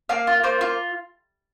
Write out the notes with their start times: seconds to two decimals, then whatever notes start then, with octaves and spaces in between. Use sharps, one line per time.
0.09 A#3 F5
0.27 F4
0.43 A#3 C5
0.61 F4